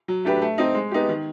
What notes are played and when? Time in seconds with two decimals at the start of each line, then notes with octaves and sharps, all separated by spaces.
0.08 F#3
0.25 A3 D4 G4 B4
0.42 A3
0.58 C4 D#4
0.75 G#3
0.91 B3 D#4 G4
1.09 D#3